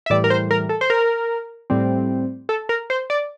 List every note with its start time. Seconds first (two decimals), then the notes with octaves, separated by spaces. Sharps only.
0.06 E5
0.10 A2 E3 G3 D5
0.24 A#4
0.30 C5
0.51 A#4
0.69 A4
0.81 C5
0.90 A#4
1.70 A2 G3 C4
2.49 A4
2.69 A#4
2.90 C5
3.10 D5